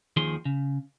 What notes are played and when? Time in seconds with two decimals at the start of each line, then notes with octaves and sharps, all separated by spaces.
0.17 D#2 D#3 F3 G#4 C6
0.45 C#3